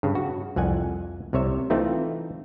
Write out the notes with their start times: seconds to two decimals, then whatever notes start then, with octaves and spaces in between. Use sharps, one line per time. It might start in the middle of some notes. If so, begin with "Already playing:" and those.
0.03 G2 C#3
0.15 F#4
0.56 C2 F2 F#5 G#5
1.33 C2 C3 C#5 E5
1.70 E3 A3 C4 D#4 F4